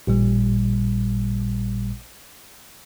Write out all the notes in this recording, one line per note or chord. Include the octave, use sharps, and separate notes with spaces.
A1 A#2 G3